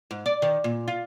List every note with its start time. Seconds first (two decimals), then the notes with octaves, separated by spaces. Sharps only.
0.11 G#2
0.26 D5
0.42 D#3
0.64 A#2
0.88 F4